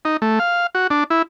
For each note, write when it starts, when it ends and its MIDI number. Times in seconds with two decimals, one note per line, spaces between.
0.05 0.17 63
0.22 0.39 57
0.39 0.67 77
0.75 0.87 66
0.90 1.04 62
1.10 1.22 64